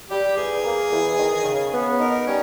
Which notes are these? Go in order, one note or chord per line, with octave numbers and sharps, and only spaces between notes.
G3 G4
E2 G#4
A#3
E2
D#3
C#3
B3
D#4 A#4
G3 C#4